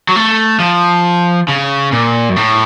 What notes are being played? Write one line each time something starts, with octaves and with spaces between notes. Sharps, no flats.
F#3
A3
F3
C#3
A#2
F#2
A2